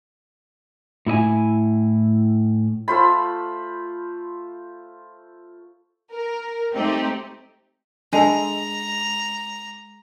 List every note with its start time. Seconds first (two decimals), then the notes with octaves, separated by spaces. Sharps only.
1.06 A2 E4 D#5 G#5
2.88 A3 F4 C5 B5
6.14 A#4
6.74 A3 C4 D#4 G4
8.13 G#3 D4 A4 A#5